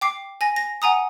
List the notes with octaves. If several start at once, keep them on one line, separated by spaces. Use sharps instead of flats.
G5 D6 C7
G#5 A#6
A#6
F#5 G#5 A#5 D#6